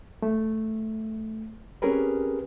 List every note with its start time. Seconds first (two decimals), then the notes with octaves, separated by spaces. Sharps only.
0.22 A3
1.82 C4 C#4 G4 G#4 A#4 B4